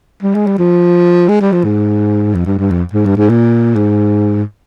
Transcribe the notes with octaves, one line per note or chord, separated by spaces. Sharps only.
G3
G#3
G3
F3
G#3
G3
F3
G#2
F2
G2
G2
F2
G#2
G2
G#2
A#2
G#2